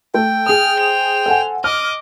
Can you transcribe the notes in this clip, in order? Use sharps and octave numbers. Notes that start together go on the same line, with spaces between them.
A3 G5
G#4 D#6 F6
C5 F7
A4 F#5 G#5
D#5 D6 F6